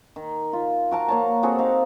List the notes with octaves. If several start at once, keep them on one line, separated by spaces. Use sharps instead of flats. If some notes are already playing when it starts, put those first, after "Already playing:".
D#3
F4
F#4 A#4 A5
A#3 C#5 A5
C4 F#4 G#4 A4
D#4 G4 F5